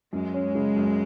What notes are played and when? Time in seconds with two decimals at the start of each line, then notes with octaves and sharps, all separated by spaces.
0.13 F#2 G#3
0.34 C#4
0.55 C#3
0.77 F#2